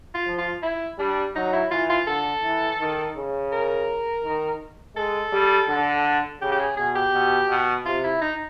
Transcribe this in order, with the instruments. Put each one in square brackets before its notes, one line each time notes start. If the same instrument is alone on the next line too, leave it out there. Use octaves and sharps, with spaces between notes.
[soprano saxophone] F4
[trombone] F3
[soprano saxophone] F4
E4
[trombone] G3 [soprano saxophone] D4
[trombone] F#3 [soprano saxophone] D#4
[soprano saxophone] E4
[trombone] E3 [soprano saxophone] F4
[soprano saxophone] F4
[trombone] D3 [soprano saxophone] A4
[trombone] E3
D#3
C#3
[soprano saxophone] A#4
[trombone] D#3
[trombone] G#3 [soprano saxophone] A4
[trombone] G3
D3
[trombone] C#3 [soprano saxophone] G4
[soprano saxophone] G4
G#4
[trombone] B2 [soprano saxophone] G#4
[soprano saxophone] G4
[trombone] B2
B2
[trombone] C3 [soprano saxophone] F4
[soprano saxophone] E4
D#4